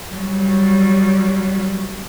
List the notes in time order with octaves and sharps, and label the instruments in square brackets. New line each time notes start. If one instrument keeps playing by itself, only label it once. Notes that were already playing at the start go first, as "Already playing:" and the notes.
[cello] F#3 G3